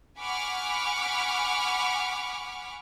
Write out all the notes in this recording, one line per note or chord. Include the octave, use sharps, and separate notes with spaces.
F#5 G#5 B5 C#6 D6 F6